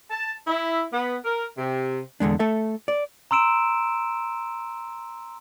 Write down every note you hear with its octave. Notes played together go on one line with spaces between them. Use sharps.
A5
E4
B3
A#4
C3
E2 D3 G#3 D4
A3 A4 E5
D5
A#5 C6 E6 D7 E7